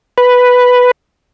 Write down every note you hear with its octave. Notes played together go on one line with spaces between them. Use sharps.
B4